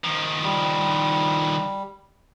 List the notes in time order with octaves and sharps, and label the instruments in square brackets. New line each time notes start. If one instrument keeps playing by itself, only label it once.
[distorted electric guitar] D#3 F3
[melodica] G3